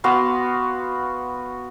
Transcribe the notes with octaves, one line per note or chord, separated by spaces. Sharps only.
B3 F#4 F5 C6